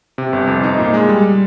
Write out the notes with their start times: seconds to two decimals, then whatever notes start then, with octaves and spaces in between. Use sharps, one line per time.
0.18 C3
0.33 G1
0.47 F2
0.63 D#4
0.78 A#2
0.94 G#3
1.09 G3